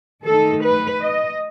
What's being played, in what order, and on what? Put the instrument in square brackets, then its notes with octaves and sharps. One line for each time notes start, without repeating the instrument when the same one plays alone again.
[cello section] D#3 A3 D#4 A4
B4
D#5